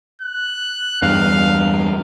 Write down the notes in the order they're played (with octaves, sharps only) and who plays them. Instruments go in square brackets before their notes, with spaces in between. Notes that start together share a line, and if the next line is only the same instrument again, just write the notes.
[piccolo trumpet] F#6
[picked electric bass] E2 G2 [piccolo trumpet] F5